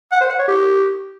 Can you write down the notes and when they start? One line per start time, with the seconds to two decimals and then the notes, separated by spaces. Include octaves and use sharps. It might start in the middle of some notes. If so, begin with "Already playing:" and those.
0.12 F#5
0.21 C5
0.30 F#5
0.39 C#5
0.48 G4